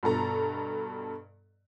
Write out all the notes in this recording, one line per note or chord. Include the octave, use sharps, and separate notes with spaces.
G2 B2 A4 A#5